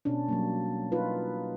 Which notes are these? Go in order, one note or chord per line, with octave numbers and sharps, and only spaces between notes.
B2 C#4 D4
F#3 G3 A#3
D#4 F4 B4